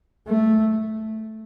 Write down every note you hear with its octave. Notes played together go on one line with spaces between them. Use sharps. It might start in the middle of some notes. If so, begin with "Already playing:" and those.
A3